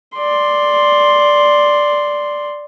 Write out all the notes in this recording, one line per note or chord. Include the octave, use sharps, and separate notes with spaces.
D5 C6